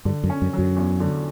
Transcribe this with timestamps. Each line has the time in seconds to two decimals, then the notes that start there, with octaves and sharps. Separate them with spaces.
0.05 G2 D3
0.24 F#2
0.30 C#4
0.42 F#2
0.53 F#3
0.58 F#2
0.77 E2
1.00 D3